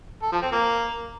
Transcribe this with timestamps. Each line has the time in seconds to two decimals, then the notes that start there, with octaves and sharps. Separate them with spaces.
0.22 A4
0.32 F3
0.42 C4
0.52 A#3